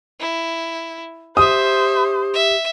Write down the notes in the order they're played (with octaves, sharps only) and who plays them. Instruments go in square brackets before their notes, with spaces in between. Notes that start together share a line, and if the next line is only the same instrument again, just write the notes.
[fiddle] E4
[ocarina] G4 [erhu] C5 [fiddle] E5 [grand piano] D#6
[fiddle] E5